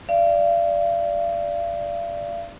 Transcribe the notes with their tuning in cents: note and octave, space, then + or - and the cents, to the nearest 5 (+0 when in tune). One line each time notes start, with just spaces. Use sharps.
D5 +0 F5 -40